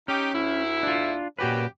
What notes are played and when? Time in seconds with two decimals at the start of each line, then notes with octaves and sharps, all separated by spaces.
0.08 C#4 D#4 G4
0.33 D2 E4
0.83 D4 F4
1.39 F#2 A#2 C#3 F#4 G4 B4